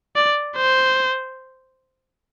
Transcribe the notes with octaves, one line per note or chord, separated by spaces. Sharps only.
D5
C5